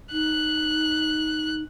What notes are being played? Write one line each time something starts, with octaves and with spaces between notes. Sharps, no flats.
D#4 F#6